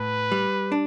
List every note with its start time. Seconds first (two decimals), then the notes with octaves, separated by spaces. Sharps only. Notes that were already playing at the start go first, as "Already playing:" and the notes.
Already playing: A2 B4
0.32 G3
0.72 D4